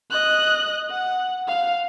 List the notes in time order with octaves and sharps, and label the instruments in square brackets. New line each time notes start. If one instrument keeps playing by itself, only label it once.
[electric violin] D#5 F#6
F#5
F5